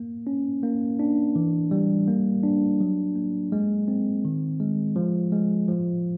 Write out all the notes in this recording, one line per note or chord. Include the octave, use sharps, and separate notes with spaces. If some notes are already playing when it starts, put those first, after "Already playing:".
Already playing: A#3
C#4
A#3
D4
E3
G3
A#3
D4
F#3
A#3
G#3
C4
D#3
G#3
F3
G#3
F3